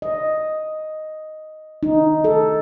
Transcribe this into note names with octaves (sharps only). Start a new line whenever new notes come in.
D#5
D#4
A4